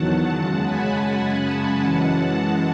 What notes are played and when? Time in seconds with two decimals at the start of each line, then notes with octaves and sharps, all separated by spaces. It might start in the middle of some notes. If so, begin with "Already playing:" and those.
Already playing: E2 D#3 F#3 F#5 A5
0.27 F#2 C#3 G#3 F#5 A5
0.64 G#5 B5
1.76 F#2 E3 G#3 F#5 A5